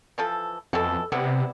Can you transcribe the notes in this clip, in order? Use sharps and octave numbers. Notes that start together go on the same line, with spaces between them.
E3 F3 A4
F2 B2 E3 A4
C3 G3 B3 E4